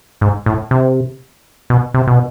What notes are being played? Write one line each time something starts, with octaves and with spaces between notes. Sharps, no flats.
G#2
A2
C3
B2
C3
B2